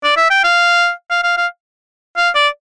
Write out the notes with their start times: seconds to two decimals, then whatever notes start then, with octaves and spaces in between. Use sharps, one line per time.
0.04 D5
0.17 E5
0.30 G5
0.44 F5
1.10 F5
1.24 F5
1.37 F5
2.17 F5
2.35 D5